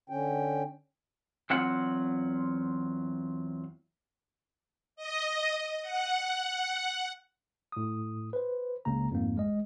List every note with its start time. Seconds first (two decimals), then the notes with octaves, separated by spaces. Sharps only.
0.09 D3 C#4 G5
1.50 E2 F#3 C4 F4 F#5
4.96 D#5
5.82 F#5
7.72 A2 D#6
8.33 B4 C5
8.85 C#2 C#3 A#3 A#5
9.11 F2 G#2 A#3
9.36 A1 G#3 D#5